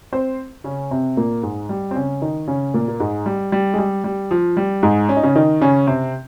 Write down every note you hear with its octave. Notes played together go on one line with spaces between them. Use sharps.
C4 C5
C#3 C#4
C3 C4
A#2 A#3
G#2 G#3
G3
C4
C#3 C#4
D#3 D#4
C#3 C#4
A#2 A#3
A#3
G#2 G#3
G3
G3
G#3
G3
G3
F3
G3
G#2 G#3
C#4
D#4
C#3 C#4
D#3 D#4
C#3 C#4
C3 C4